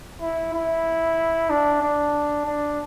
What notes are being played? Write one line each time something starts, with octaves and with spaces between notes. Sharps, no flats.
E4
E4
D4
D4
D4